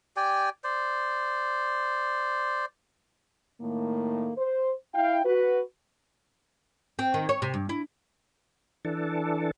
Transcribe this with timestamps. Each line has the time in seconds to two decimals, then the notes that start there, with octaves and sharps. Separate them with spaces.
0.17 G4 D5 G5 G#5
0.64 C5 D5
3.61 A2 D#3 A3 A#3
4.38 C5
4.95 E4 F5 G5
5.25 F#4 B4
6.99 C4
7.14 D#3
7.29 C#5
7.42 C3
7.54 G2
7.69 E4
8.85 E3 D4 A4